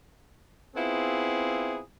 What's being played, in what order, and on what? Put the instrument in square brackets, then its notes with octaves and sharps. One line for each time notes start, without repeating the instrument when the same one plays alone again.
[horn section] B3 C4 E4 F4 G#4